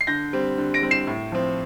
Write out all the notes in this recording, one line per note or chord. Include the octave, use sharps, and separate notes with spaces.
C7
D3 G6 A#6
G3 C4
D3
A#6 D7
G3 C4
C7 E7
A2
F3 C4